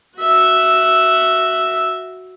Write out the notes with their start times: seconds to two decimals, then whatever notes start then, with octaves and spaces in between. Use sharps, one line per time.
0.19 F#4 E5